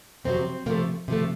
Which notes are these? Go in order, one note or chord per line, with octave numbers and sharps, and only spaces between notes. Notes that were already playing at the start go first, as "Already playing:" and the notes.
F2 C3 F#3 C4
C3 F3 A3 A#3
C3 F3 A3